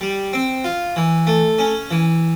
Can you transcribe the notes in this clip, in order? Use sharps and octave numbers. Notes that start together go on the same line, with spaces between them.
G3
C4
F4
E3
A3
C#4
E3